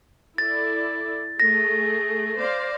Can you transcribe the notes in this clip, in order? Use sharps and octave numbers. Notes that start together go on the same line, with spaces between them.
E4 A4 D5 A6
A3 G#4 A#6
C5 D5 F5